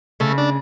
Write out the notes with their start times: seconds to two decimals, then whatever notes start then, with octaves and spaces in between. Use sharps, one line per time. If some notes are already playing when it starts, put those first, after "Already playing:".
0.20 C#3 A3
0.38 D4